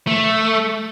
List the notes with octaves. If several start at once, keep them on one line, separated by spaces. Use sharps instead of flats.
A3